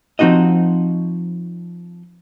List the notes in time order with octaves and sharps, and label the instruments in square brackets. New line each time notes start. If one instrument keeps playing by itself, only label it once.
[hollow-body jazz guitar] F3 C4 D#4 F#4 D#5